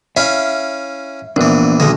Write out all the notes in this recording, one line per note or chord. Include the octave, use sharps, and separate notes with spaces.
C#4 E4 E5 F5
A#1 E3 B3 D4
B1 D3 D#3 G#3